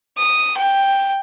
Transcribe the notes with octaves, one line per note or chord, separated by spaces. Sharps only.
D#6
G5